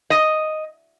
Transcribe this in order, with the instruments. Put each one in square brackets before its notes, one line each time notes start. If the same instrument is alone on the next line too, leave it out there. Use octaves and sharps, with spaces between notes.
[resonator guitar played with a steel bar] D#5